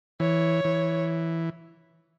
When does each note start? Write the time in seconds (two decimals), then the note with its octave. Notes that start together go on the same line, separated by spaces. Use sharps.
0.20 E3 C#5
0.65 E3